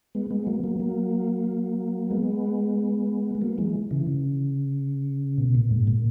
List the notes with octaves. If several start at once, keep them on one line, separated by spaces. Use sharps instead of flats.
G#3 B3
G#3 B3
F#3 A#3
F#3 A#3
F#3 A#3
G#3 B3
G#3
F#3 A#3
E3 G#3
C#3 E3
C#3
B2
A#2
G#2
A#2